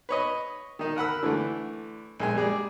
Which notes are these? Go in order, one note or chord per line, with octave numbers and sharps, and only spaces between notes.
B4 C#5 D#5
D#3 D#4
A#4 F#5 B5 E6
D3 E3 A3
A#1 G#3 G#5
G3 G#3 G#4 D5